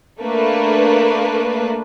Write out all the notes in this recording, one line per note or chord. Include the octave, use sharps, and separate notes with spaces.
A3 A#3 D4 B4